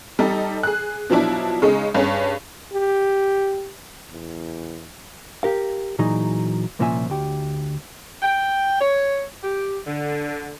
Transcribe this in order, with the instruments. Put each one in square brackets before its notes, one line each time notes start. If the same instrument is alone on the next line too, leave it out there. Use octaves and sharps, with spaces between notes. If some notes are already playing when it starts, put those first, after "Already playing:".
[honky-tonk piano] G3 D#4 A4
G#4 F#6
B2 F3 F#3 D4 E4
C#3 G#3 D#4
G2 C#4 G#4
[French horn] G4
E2
[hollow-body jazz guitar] G4 A#4 F5
A#2 E3 F#3 D#4 G#4
C2 A#2 F3 C#4 E5 G#5
D2 G4
[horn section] G5
C#5
G4
D3